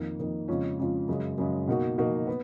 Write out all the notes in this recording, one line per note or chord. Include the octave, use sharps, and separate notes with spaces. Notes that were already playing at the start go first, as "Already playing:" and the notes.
Already playing: F2 D#3 A#3 D#4
F2 D#3 A#3 D#4
F2 C#3 G#3 C#4 F4
F2 C#3 G#3 C#4 F4
F#2 C#3 G#3
F#2 C#3 G#3
B2 A#3 D#4 F#4
B2 A#3 D#4 F#4
B3